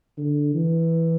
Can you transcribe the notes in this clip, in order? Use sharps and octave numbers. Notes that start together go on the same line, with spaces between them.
D3
E3